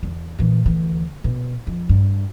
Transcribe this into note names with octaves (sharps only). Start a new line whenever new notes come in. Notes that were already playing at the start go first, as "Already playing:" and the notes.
E2
A#2 E3
D2 E3
B2
F2
G2